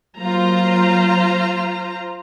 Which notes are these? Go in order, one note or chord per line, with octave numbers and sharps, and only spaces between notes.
F#3 A#3 F4 C5 A#5